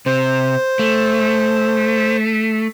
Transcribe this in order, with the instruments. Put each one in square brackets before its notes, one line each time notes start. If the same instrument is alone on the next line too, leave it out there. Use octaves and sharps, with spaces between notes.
[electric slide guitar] C3 [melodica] C5
[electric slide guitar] A3